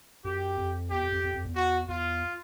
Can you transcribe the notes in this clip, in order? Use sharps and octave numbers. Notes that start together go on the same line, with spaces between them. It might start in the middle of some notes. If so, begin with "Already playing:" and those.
F#2 G4
F2
E2 G4
F2
F2
F2
F2
E2
F#4
E2 F4